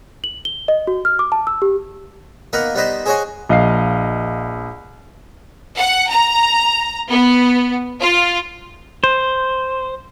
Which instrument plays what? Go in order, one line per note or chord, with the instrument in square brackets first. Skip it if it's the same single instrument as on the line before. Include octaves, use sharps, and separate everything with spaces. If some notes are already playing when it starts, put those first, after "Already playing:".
[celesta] F#7
G7
D#5
F#4
F6
D6
A5
E6
G4
[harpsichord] A#3 B3 D#4 A#4 F#5
G3 B3 D#4 B4 C5 D#5
G#4 C5 C#5 D#5 F#5 G#5
[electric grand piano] A#1 D#5 F5 C7
[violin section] F#5
A#5
B3
F4
[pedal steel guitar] C5